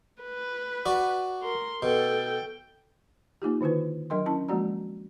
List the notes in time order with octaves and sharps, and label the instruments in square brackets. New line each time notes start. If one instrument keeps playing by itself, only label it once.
[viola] B4
[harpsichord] F#4 D5
[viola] A#4 C6
[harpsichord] B2 [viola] A4 G5
[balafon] A#3 D#4 F4 G4
D3 D#3 E4 F4 B4
F#3 D4 A#4 D#5 G5 C6
C#4 E4 A5
F3 G#3 A#3 F#4 D5 A#5